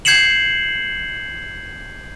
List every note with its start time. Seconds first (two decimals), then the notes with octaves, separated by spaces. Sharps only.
0.05 G6 G#6 C7 C#7 E7 F#7